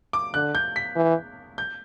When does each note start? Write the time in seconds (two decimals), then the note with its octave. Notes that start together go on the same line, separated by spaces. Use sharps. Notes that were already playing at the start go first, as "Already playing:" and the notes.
0.13 D6
0.34 D3 F#6
0.55 G6
0.76 B6
0.96 E3
1.58 G6